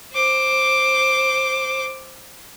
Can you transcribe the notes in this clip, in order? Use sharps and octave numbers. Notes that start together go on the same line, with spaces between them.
C5 D6